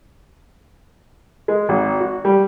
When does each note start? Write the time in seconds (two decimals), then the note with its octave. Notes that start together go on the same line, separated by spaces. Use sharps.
1.48 G#3
1.69 G#1
2.00 F#4
2.25 G3